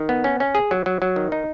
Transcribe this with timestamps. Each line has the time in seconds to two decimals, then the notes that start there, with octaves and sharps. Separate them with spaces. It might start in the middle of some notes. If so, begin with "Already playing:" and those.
Already playing: D#3
0.09 B3
0.24 C#4
0.40 C#4
0.55 G#4
0.71 F#3
0.86 F#3
1.02 F#3
1.16 D#3
1.32 D#4